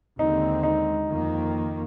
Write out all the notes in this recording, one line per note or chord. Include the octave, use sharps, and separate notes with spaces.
D#2 D3 G#3 C4 D#4
D#4
F2 D#3 A#3